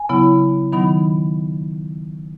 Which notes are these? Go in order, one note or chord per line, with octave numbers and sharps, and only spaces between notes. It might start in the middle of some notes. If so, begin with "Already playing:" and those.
Already playing: G#5
C#3 F#3 B3 E4
D#3 F#3 B3 D#4 B5